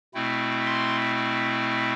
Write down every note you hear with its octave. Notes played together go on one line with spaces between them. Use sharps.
B2 A3 C4 E4
C6